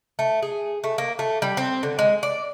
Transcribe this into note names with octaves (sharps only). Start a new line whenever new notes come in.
A3
G#4
A3
A#3
A3
G3
C4
D3
G#3
D5